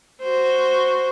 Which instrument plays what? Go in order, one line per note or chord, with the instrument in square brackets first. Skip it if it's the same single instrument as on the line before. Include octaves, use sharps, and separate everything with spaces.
[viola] F#4 C5